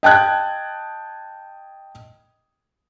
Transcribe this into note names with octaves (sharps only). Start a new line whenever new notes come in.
D#5 G5 A5 F#6 G#6